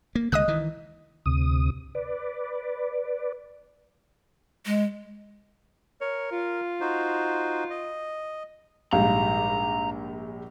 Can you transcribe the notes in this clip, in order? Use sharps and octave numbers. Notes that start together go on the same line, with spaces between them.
A#3
C2 D3 G#3 D#5 D#6 F#6
D#3 E3
D2 C3 D#6
B4 D5
G#3
A#4 C#5
F4
D#4 F#4 C5
D#5
A#1 G#2 G3 F5 A#5